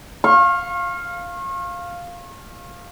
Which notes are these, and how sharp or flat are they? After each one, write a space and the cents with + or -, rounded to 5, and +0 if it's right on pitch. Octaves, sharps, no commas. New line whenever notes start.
F5 +0 C#6 -40